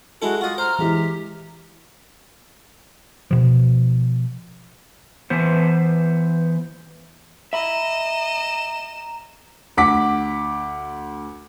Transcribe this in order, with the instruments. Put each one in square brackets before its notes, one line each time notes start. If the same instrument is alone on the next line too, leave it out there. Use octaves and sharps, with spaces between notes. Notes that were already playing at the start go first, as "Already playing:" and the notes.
[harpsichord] G#3 E4 A4 [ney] F#4
[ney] F4 [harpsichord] F#4 D#5
[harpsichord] C5 [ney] A#5 [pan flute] F6
[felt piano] E3 G#3 E4 [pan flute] G4
[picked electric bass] B2 F3
[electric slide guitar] E3 B3 C5
[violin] D#5 E7 [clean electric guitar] E5 B5 [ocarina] A#5
[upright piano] D2 F#5 D6 B6